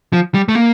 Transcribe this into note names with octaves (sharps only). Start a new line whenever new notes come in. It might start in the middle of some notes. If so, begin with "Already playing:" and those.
F3
G3
A3
A#3